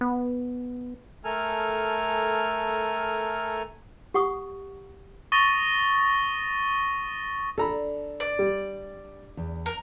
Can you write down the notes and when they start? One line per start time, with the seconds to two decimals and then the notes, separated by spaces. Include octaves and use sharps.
0.01 B3
1.25 A3 A4 A#4 G#5 F6
4.14 G4 F#5 C#6 D#6
5.32 C#6 D#6 A6 A#6 D#7 G7
7.58 D4 A4 A#5 B5
8.20 D5
8.39 G3
9.37 E2
9.66 A#4